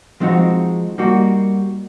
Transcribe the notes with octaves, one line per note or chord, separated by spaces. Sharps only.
F3 G#3 C4 D#4 F#4
G3 A#3 D#4 F#4